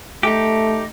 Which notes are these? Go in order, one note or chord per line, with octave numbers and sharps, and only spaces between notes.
A3 D#4 G4